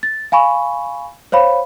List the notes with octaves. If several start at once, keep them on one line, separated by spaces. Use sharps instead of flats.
A6
F5 G#5 B5 C#6
C5 C#5 F5 B5